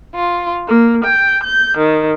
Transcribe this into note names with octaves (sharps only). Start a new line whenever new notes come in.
F4
A#3
G5
G6
D#3